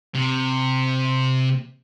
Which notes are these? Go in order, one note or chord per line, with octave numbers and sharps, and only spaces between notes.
C3